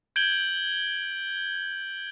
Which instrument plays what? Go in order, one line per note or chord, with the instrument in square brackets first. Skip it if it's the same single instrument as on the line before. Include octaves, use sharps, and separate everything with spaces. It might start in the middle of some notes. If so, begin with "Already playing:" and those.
[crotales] G6 G#6 D7 F#7 G7